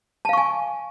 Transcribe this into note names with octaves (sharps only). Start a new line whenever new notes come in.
F5 G#5 A5 C#6